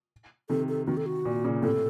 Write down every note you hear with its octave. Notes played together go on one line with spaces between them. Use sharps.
C3 D#3 A4
A4
C3 D#3 F#4
A4
F#4
A#2
A#2 C#3
A2 C3 A4